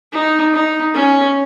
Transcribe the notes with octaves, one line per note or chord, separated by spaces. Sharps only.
D#4
D#4
C#4